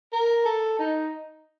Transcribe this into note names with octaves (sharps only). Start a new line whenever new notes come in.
A#4
A4
D#4